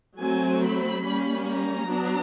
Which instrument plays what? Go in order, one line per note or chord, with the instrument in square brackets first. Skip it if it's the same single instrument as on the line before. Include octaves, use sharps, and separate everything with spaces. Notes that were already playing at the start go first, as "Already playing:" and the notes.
[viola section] F#3 A3 C4 G#5
B5
G3 A#3 C#4
A#5
F#3 B3 D4